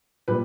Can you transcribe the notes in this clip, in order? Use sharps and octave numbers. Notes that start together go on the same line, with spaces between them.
A#2 G3 B4